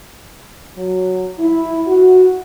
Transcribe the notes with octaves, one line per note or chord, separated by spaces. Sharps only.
F#3
E4
F#4